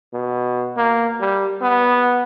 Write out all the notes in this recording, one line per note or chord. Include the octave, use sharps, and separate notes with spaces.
B2
A#3
G3
B3